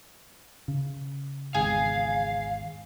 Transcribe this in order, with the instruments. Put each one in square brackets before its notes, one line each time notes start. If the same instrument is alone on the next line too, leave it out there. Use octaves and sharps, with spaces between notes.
[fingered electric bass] C#3
[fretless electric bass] G#1 E2 [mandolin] G#4 [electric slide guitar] F5